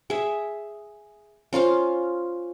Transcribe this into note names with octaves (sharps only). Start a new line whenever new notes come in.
G#4 E5
C#4 F4 C5 F5